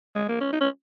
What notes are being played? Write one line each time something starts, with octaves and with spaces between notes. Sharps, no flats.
G#3
A#3
C#4
D#4
C#4